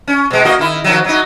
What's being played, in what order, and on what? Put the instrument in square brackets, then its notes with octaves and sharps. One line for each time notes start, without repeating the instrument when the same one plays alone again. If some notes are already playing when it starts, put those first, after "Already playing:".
[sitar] C#4
B2 G#3
A#3 F#4 D#5
D#3 E4
D#3 F3 F#3
F#3 D#4